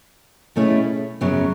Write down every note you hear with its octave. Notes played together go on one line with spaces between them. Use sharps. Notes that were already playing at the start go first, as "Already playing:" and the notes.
B2 A3 C#4 E4 G#4
F#2 C#3 F#3 B3